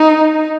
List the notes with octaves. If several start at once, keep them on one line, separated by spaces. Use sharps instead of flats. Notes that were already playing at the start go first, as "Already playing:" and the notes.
Already playing: D#4